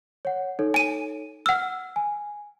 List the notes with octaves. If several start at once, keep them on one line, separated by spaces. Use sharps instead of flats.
C#5 F#5
D#4 A4 C#5
G#5 D#7
F#5 E6 F6
G#5